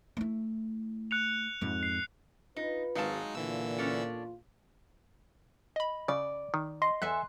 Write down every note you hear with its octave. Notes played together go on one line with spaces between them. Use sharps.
A3 E4
F#6 C#7 F7
F2 G#2
C7
D#4 F4 B4
G#1 F#3 G#3 D#4 F5 A5
E2 A#2 D3 E3 F4 E6
C#4 D4 A4
D#5 B5
C#3 D5
D#3
D#5 C6
E2 A4 E5 G#5 F#6